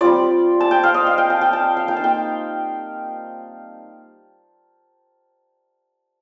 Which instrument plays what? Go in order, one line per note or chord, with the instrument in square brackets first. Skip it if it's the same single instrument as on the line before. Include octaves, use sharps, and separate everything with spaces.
[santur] G3 C4 F4 D5
A5
G5
F5
D#5
F5
G5
A5
G5
A5
F5
A#3 D#4 G5
A5
G5